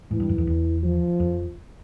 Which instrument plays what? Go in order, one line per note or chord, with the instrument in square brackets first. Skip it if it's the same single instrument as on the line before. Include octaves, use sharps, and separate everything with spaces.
[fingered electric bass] G#2 [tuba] E3
[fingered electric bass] G2
F#2
F2
E2
[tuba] F3
[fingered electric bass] F2